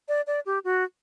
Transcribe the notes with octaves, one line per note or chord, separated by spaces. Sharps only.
D5
D5
G4
F#4